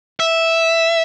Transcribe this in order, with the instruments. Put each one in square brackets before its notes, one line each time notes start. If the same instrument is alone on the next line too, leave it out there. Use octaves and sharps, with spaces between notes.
[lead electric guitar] E5